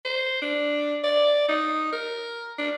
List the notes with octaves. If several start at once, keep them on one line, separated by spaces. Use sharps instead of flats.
C5
D4
D5
D#4
A#4
D4